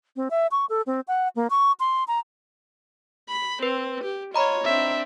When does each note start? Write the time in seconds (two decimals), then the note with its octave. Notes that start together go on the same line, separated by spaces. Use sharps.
0.16 C4
0.31 E5
0.51 C#6
0.69 A4
0.87 C4
1.08 F#5
1.36 A#3
1.50 C#6
1.80 C6
2.08 A#5
3.28 B5
3.63 C4 B4
4.04 G4
4.34 F4 C#5 D#5 A#5 B5
4.65 C4 D4 E5